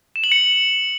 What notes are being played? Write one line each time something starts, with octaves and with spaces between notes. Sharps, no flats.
E7
F#7
C#7